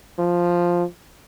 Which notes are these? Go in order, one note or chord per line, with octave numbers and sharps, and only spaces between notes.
F3